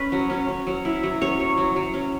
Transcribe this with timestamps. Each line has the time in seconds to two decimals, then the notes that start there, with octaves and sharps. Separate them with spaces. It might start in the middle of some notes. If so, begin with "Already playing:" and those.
Already playing: C#4 B4
0.12 F#3
0.30 C#4
0.48 C#4
0.67 F#3
0.85 E4
1.03 F#3
1.21 C#4 C#5
1.40 F#3
1.58 F#3
1.76 F#3
1.94 C#4